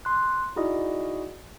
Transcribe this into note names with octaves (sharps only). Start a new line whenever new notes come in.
C6 F#6
D#4 E4 F#4 G#4 D5 D#5